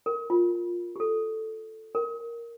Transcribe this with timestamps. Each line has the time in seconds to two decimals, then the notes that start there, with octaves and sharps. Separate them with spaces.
0.06 A#4
0.30 F4
0.96 G4
1.00 A4
1.95 A#4